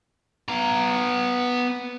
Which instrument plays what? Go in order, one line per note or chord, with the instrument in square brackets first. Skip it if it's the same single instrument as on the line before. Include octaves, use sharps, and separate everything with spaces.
[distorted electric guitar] B3 A#5